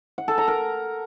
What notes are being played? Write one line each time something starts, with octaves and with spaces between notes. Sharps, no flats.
F#5
A4
A#5
A#4